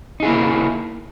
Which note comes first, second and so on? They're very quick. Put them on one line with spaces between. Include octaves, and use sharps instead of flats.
D#4 G#4 E4 A#3